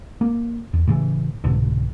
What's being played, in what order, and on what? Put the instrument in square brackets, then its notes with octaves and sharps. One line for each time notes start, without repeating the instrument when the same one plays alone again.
[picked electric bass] A#3
E2
A2 C#3 E3
C2 G#2 B2 D3